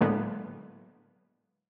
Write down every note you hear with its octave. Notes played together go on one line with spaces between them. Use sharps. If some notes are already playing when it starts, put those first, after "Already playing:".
A2 D3 F#3 G#3 A#3 B3